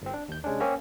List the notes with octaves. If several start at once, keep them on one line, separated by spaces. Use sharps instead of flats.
G1 C4
D4
D#2 G6
C3 G#3 C#4 D4
A#3 C4 C#4